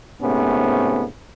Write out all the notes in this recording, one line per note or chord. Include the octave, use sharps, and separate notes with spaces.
G#2 C3 A3 B3 C#4